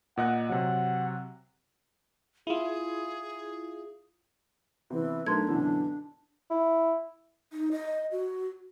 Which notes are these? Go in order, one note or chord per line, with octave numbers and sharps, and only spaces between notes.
A#2 D#5 F#5 F#6
C3 F#3 F#5
E4 F4 G#4
C3 E3 B3
B1 A3 D4 A#4 C6 G#6
F#2 B2 D3 E3
E4
D#4
D#5
F#4